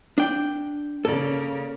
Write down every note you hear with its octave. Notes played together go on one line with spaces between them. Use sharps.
D4 G5
C#3 A#3 A4 D5